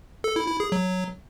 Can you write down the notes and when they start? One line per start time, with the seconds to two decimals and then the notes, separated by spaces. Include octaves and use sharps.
0.24 A4
0.36 E4
0.48 E4
0.60 G#4
0.72 F#3